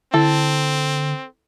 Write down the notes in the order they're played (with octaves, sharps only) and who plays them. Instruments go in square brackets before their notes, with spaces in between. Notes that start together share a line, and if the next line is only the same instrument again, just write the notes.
[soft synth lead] D3 [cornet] C4 [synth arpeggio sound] E4 [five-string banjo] A4